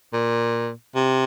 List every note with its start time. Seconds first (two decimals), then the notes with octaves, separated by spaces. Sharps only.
0.14 A#2
0.95 C3